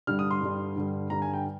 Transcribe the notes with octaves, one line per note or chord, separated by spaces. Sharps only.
G2 D3 G3 F6
D#6
C6
G2 D3 G3
G2 D3 G3
G2 D3 G3 A#5
G#5
G5